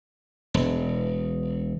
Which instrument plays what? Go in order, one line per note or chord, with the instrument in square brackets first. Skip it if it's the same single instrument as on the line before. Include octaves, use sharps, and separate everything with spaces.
[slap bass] E1